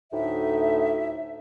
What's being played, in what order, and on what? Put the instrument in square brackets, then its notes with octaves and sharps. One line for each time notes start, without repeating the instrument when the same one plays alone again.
[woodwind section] D2 A2 D#4 E5